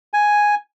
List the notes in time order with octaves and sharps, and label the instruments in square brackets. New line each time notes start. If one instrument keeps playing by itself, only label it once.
[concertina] G#5